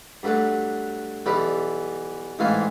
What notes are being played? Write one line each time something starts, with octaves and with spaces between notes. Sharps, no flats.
G2 F#3 A3 F#5 D6
B1 E3 G3 G4 D5 B5
A1 G#2 E3 F5 G#5 C6